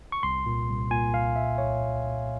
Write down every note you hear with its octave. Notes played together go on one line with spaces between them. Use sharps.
C#6
C2 C6
A#2
C2
A#2 G#5
C2 F5
C2 E5
C2 C#5
C2
C2